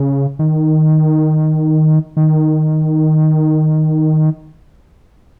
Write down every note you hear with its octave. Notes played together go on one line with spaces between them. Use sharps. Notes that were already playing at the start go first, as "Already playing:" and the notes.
Already playing: C#3
D#3
D#3